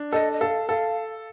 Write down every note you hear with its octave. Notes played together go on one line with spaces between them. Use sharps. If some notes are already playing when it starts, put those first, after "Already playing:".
Already playing: D4
A4 D#5
D#5
A4 F5
A4 F5